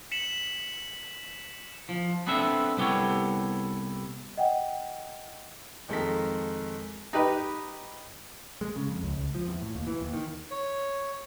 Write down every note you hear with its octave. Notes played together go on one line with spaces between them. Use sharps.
B6 C#7 E7 F#7
F3
B3 C4 D4 A4 E5
C2 B3 G4 A4 C#5
D#5 F#5 G5
F2 D#3 G#3 A4 A#4 B6
D#4 G4 B4
G#3
C#3
F2
C#2
C#2
F3
E2
A2
D#2
E3
D#2
D#3
C#5